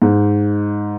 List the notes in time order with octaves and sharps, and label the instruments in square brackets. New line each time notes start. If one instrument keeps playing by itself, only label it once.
[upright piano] G#2